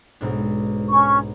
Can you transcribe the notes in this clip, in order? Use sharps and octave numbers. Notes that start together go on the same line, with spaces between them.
B1 G#2 D4
C#4 C#6